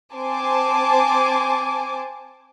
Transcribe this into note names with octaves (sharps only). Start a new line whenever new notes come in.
C4 C5 G#5 A5 D6